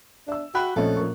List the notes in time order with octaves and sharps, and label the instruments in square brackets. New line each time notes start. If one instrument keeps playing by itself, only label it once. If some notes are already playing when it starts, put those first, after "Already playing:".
[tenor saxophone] D4 [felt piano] E5 E6
[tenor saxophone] F#4 [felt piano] E5 [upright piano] G5 B5 F#6
[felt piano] A#1 C4 D#5 [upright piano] F3 A3 C#4 [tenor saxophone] A4
[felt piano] A#1 A#4 C#6